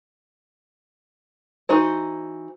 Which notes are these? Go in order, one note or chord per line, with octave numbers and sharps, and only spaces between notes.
E3 D#4 F#4 C5